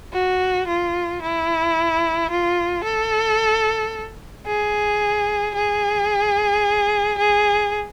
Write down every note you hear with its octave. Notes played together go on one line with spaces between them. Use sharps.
F#4
F4
E4
F4
A4
G#4
G#4
G#4